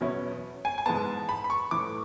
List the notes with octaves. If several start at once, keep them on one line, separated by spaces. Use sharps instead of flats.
E2 B2 F#3 C#4 E4
G#5
G#5
G#2 E3 G#3 B3 A5
B5
B5
C#6
A2 E3 A3 D6